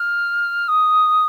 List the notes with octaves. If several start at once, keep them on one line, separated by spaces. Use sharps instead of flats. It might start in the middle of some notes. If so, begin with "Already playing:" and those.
Already playing: F6
D#6